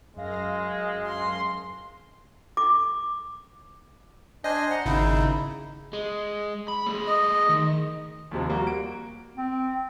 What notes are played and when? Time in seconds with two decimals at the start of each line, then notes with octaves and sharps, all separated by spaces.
0.16 F#2 G#3 F5 A#6
1.07 C6
2.57 D6
4.44 D4 C5 D#5 G#5
4.71 F#5 A#5
4.86 G#1 C#3 D#4 E4
5.93 G#3
6.68 B5
6.87 A3 G#4
7.07 D#5
7.49 D#3
8.31 D#2 C3 F3
8.48 G3 A#3 F#4
8.67 D7
9.36 C4